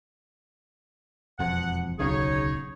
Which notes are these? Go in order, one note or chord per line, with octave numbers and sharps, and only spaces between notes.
E1 F2 F#5
D1 B1 C#3 D#4 G#4 C#5